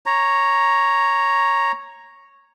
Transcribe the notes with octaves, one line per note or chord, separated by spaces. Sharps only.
C#5 A#5